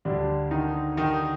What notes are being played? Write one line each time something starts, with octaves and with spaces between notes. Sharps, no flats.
D2 D3 G3 D4
D#3 D#4
D#3 D#4